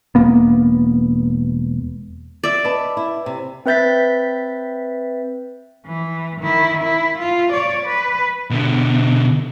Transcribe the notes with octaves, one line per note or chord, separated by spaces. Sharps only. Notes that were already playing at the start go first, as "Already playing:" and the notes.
E1 A#3 B3
D5 E5
B4 D#5 A5
E4
C3
C4 B4 E5 G6 A6 B6
E3
D#3 E4
E4
F4
C#5 D5
B4
B2 D3